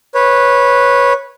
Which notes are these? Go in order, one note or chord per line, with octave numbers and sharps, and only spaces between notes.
B4 C#5